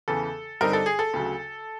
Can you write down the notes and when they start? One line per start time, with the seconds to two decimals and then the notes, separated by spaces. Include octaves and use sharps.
0.08 E2 C#3 E3 A4
0.61 G2 D3 G3 C4 D#4 A#4
0.73 A4
0.86 G#4
0.99 A4
1.14 D2 C#3 F#3